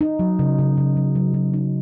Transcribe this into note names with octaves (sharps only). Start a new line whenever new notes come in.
D#4
F#3
C#3
C#3
C#3
F#3
F#3
F#3
D#4